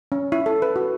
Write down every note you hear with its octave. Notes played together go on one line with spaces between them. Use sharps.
C#4
E4
A4
B4
F#4